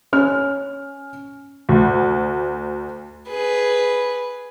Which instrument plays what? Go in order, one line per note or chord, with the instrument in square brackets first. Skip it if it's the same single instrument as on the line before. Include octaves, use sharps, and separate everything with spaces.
[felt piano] C#4 F6
[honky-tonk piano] D2
[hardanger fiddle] G#4 B4